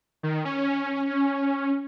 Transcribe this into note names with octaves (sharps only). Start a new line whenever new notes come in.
D#3
C#4